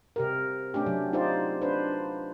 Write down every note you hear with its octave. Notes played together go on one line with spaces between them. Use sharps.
C3 G4 A#4
A3 C#4 D4 G4
C3 F#3
D#4 F4 G4 C5 D5
D4 B4 C5